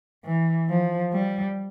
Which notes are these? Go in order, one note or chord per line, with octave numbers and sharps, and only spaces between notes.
E3
F3
G3